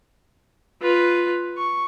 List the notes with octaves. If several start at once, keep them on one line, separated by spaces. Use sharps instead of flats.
F4 B4
C#6